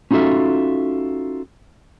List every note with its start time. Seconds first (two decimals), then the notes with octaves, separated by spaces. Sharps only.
0.11 C#4 D#4 F4 F#4 A4 E5